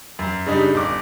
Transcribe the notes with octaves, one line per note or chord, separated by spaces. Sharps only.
F#2
C#3 G3 D4 D#4
G1 D6